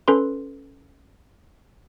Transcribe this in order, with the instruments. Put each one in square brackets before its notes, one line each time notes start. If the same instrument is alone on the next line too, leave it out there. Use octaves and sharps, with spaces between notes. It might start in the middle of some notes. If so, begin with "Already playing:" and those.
[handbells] C#4 A4 B4 C6